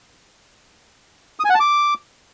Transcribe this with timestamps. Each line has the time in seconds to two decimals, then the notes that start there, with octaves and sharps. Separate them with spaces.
1.40 D#6
1.45 G#5
1.50 F#5
1.55 A5
1.60 D6